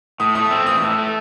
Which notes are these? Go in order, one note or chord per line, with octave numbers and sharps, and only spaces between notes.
A2 D#6
A3 D#6
C4 E6
E3 D#6
A2 E6
A3